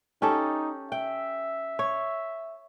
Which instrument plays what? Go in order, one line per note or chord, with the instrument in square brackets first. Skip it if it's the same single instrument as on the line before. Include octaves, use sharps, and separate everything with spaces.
[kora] C#4 G4 A4 [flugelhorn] D#4
[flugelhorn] E5 [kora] G5
[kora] C#5